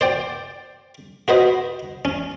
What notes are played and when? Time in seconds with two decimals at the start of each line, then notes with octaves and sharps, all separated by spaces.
0.01 C5 D5 G5
1.28 F#4 B4 C5 D#5
2.05 C#4